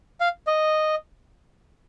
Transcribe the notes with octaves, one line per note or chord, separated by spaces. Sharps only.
F5
D#5